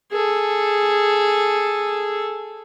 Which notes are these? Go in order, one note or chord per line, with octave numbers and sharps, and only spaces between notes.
G#4 A4